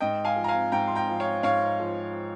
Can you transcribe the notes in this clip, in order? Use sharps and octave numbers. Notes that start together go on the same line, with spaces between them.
G#2 D#5 G5
F5 G#5
F3
A#5
F5 G#5
G#2 G5 A#5
C6
G5 A#5
F3
C#5 F5
G#2 C#5 F5
F3